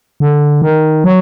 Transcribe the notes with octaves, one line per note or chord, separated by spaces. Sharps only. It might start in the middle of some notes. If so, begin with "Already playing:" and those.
D3
D#3
F#3